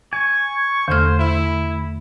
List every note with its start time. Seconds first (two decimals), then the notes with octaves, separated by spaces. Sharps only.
0.13 G#5 C#6
0.88 E2 D3 A3 C5 F6
1.19 E4